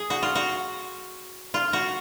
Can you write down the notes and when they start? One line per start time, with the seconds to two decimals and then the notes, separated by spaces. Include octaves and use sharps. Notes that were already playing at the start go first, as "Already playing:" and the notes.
Already playing: G#4
0.10 F#4
0.23 F4
0.35 F#4
1.54 F4
1.73 F#4